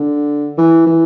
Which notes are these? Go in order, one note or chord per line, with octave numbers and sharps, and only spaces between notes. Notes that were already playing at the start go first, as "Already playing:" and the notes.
Already playing: D3
E3
E3